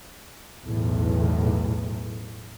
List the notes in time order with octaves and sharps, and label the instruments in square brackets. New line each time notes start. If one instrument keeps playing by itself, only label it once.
[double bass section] B1 E2 A2